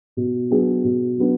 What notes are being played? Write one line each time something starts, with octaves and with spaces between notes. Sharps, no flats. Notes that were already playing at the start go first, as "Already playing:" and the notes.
B2
F#3 B3 D4 G#4
B2
F#3 B3 D4